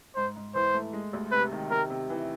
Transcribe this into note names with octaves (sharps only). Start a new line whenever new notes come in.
G#2 C5
G#2
E3 C5
A3
G#3
D2
C3 B4
D#3
C3 A#4
C3
E3